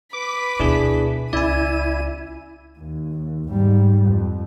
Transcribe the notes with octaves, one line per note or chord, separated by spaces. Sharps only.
B4 D6 B6
D2 B2 D4 E4 G#4
C#2 E4 D5 G#5 D#7
D#2
G#2 G3
F2